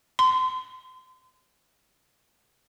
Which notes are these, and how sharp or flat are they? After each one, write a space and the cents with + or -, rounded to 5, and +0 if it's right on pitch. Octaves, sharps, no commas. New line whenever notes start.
C6 -30